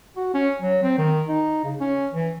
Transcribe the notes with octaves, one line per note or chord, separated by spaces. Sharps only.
F#4
C#4
F#3
C4
D#3
D#4
C#3
C#4
E3